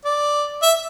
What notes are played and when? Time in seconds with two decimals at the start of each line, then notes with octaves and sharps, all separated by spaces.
0.05 D5
0.62 E5